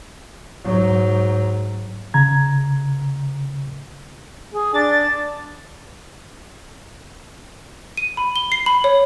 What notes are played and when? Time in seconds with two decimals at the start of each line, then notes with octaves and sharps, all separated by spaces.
0.64 G#2 F#3
2.14 C#3 A#5 G#6
4.54 G#4
4.74 D4 A6
7.97 D#7
8.17 B5
8.36 G7
8.52 C7
8.66 B5
8.84 C#5